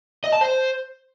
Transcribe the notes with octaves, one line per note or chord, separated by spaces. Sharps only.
D#5
A5
C5